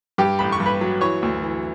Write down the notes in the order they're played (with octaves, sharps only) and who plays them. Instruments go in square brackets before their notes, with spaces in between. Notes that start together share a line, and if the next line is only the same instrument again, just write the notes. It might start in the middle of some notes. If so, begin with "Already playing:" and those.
[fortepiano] G2 G4 G5
A1 B5
C#6
G2
B4 B5
F#3
E3 C#5 C#6
D2
E3